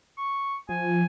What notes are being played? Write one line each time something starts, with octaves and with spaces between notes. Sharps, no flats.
C#6
F3 G#5